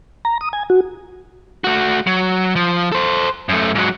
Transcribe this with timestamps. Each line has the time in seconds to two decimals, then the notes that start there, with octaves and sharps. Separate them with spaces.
0.25 A#5
0.41 D#6
0.53 G#5
0.70 F#4
1.64 A3 F#4
2.07 F#3
2.56 F3
2.92 A4 C5
3.49 F#2 A3
3.75 G#2 F#3